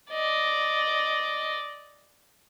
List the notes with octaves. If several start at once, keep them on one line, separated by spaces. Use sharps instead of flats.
D5 D#5